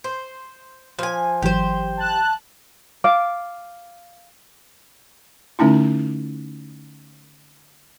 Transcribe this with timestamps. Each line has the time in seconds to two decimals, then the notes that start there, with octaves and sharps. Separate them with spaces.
0.04 C5
0.99 F3 G#5
1.42 G#1 E3 F#3 G4 C5
1.97 A5 F#6
3.04 F5 D6
5.59 D3 A3 C#4 D#4 E4